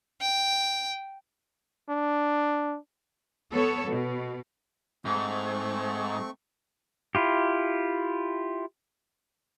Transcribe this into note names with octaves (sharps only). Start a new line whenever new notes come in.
G5
D4
B3 A4 C#5
B2
G#2 A3 C4 C#6
E4 F4 G4